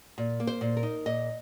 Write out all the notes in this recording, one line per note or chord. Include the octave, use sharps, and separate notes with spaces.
A#2
A#3
C5
A#2
A#4
D#4
A#2 D#5